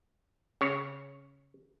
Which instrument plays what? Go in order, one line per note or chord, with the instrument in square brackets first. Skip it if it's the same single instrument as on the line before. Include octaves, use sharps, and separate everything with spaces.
[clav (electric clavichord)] C#3 C#5